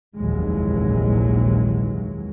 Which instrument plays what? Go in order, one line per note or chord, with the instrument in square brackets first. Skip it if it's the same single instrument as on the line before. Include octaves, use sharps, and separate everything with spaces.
[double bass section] F1 A#1 D#2 E3 F#3 G#3